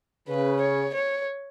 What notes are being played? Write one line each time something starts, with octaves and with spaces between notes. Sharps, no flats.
C#3 B4
C#5
C#5